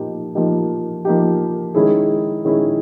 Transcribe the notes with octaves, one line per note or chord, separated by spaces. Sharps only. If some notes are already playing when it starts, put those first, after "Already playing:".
Already playing: F3 A#3 D#4 G4
F3 A#3 D#4 G4
F3 A#3 D#4 G4
D#3 G#3 C#4 E4 G#4
D#3 G#3 C#4 E4 G#4